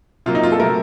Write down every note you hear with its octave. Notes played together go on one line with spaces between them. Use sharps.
C3 F#3 A#3 F4
D#4
F4
A4
C3 F#3 A3 A#4